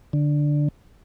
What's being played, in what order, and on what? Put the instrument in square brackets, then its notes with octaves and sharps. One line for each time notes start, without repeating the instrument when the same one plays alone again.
[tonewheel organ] D3